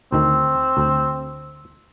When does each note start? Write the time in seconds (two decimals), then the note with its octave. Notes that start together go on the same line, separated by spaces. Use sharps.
0.12 D2 D#3 C4
0.77 D2